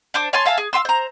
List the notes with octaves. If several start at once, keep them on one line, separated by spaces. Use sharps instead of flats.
D4 C5 D6
C#5 G#5 A5 C6
E5 F5 G#5 A5
G#4
F5 G#5 C6 E6
C5 A#5